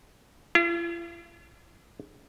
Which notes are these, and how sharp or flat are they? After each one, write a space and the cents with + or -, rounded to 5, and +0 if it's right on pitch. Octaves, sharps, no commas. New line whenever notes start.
F4 -45